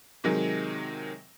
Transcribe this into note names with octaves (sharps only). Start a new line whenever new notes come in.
C3 D#3 F#3 G#3